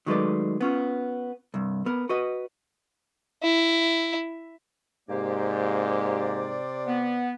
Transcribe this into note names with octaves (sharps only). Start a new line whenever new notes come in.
D#3 F#3 G#3 A3 B4 D5
B3 C#4 F4
C2 G2
B3 A#4
F#4 B4 D#5
E4
G#2 C3 A#3 G4 C5 D5
B3